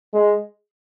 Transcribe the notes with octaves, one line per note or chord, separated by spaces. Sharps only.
G#3